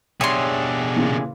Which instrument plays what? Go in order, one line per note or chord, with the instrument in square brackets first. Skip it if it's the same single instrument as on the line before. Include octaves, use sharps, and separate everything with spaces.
[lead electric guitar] B2 D4 [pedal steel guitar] G4 G#4 E5 [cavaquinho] C#5 C6
[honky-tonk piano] A#2 C#3 E3